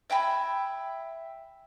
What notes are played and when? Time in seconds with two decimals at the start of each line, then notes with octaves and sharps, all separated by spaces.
0.10 E5 G5 G#5 B5